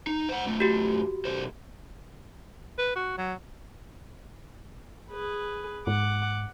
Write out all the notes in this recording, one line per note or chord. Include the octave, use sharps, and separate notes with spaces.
D#4
C5 F#5
F#2 A3
F#4 G4
B1 C5
B4
F#4
F#3
G#4 B4
G#2 F#5 D6